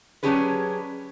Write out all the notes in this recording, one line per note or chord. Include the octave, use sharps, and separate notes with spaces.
F#3 C#4 D4 G4 G#4 B4